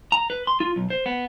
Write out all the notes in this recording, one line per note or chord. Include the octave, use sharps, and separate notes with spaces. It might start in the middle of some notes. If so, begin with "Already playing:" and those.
A#5
B4
C6
F4
B1
C5
B3